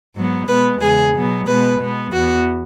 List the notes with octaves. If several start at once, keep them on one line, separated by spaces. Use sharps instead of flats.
G#2 F#3 B3
B2 G#3 B3 B4
E2 C#3 G#3 G#4
B2 F#3 B3
B2 G#3 B3 B4
B2 G#3 B3
E2 E3 B3 F#4